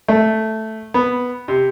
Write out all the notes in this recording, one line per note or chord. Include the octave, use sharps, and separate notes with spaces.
A3
B3
C3